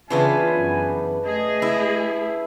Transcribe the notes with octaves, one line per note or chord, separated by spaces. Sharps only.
C#3 E3 B3 C#4 D4 F4 B4 G#5
F#2
A3 G#4 D#5
E4